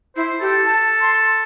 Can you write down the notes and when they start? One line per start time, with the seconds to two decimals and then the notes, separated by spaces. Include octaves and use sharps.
0.16 E4 C5
0.40 G4 A4
0.65 A5
1.01 C6